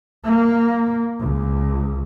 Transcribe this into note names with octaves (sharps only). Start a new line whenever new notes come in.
A#3
C#2